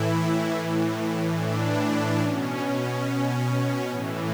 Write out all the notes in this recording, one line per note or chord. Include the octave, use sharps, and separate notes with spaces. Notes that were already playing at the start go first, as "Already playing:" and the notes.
Already playing: A2 E3 E4
A2 E3
D4
B2 C#4
A2 E3